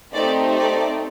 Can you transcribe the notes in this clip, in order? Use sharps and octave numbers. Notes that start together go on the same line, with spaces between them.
A3 C4 D#4 G4 D5
D5